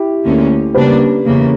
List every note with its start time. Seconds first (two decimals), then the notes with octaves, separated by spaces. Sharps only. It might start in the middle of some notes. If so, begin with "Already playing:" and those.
Already playing: E4 G4
0.24 D2 D3 A#3 C#4
0.74 C#3 G3 A#3 D4 G4 B4
1.25 E2 C#3 E3 A#3